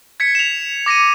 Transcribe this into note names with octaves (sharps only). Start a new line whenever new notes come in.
G#6 B6 C#7
E7 F7
D6 A#6 C#7 D#7